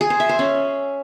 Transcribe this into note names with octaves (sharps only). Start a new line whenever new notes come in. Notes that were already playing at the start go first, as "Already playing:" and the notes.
G#4
C5
E5
C5
C#4